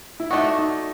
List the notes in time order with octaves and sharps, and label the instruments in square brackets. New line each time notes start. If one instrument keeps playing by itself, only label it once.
[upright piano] E4
[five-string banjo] A3 D4 F#4 [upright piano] D#4
[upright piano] D#4